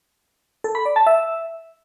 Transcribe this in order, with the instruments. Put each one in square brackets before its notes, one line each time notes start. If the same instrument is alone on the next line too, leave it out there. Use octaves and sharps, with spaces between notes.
[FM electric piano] A4
B5
D5
A5
E5